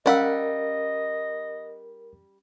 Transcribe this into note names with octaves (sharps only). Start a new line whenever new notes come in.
G3 C#4 A#4 D#5 F5 F#5 E6